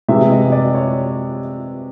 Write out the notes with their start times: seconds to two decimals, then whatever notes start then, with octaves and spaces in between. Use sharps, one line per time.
0.08 C3 E3 G#3 E5
0.30 D#5
0.52 D5
0.75 C#5